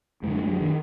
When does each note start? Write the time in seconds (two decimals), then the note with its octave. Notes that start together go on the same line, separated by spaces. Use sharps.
0.23 F#2 G#3
0.27 D3
0.35 G#3
0.49 F#3
0.61 D#3